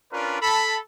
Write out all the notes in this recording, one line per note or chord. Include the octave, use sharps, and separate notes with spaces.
C#4 D4 F4 A#4 B4 D5
A4 A5 B5